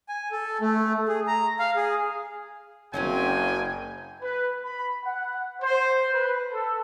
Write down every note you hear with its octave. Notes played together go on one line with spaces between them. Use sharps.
G#5
A4
A3
G#4
A#5
F5
G#4
F#1 F#3 C4 C#4 G5 G#5
B4
B5
F#5
C5
B4
A4